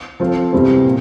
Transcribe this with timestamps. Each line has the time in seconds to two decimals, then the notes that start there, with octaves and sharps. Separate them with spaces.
0.20 F3 C4 F4 A4 C5
0.53 E2 C3 E3 G3 C4
0.85 A#2